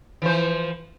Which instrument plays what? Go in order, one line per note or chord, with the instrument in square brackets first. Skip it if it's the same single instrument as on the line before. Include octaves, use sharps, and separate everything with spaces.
[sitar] E3 F3 C5